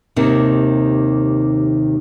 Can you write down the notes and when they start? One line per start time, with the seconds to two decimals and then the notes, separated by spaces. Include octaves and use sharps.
0.16 D#2 C3 D#3